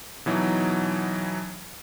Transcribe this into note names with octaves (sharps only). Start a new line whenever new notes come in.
B2 E3 F#3 D#4